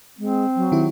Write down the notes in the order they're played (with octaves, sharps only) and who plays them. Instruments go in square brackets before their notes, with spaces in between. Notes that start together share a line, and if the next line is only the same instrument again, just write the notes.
[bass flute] G#3 [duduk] C4
[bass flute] F#3
[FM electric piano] D#3 E4 G4